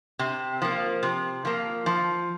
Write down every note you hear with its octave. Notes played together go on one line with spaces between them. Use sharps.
C3
F3 A#3
C3
F3 A#3
F3